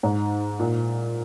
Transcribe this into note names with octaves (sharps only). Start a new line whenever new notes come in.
G#2
A#2